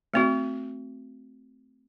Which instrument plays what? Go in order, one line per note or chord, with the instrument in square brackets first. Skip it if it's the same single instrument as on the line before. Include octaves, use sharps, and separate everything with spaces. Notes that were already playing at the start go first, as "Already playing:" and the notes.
[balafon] A3 C4 F#4